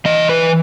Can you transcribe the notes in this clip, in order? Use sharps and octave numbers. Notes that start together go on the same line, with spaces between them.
E3 D#5
B4